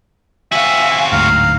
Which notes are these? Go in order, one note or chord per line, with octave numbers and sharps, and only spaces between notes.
C4 F#4 E5 F5 G#5
D1 D2 G#2 F5 A#5